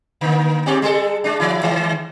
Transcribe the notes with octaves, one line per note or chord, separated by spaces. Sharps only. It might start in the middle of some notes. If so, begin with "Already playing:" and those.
D3 A#3
G#2 C4 G4
G3 G#3 A4
G#3 D4
E3 E4
D#3 G#3